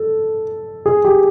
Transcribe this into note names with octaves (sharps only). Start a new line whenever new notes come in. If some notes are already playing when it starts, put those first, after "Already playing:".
Already playing: A4
G#4
G4